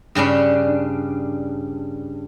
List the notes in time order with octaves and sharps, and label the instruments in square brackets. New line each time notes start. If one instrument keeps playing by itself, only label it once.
[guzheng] G2 C#3 C#4 D4